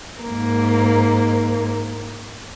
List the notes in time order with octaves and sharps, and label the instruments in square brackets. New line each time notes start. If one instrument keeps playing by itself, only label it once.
[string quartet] G#2 A#3